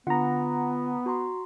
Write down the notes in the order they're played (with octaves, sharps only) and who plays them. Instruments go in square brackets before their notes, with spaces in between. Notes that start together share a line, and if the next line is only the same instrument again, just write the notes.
[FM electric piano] D3 A#5 [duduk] B3 [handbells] F4 F#5
[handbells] F#4 A#5 C6